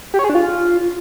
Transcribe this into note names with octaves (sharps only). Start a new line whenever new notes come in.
G4
C#5
G#4
D4
F4